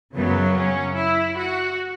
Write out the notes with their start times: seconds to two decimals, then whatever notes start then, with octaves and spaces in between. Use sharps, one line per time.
0.15 F#2 C#3 F#3 B3
0.56 C#4
0.96 E4
1.37 F#4